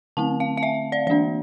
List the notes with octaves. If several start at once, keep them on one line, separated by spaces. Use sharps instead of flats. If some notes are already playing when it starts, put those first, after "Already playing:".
D3 A3 C4 A5
F5
F5
E5
D5
E3 A#3 D4 D5